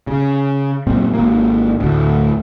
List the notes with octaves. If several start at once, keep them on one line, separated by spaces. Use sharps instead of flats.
C#3
F#2 A#2 C4
G#1 A#3
D2 A2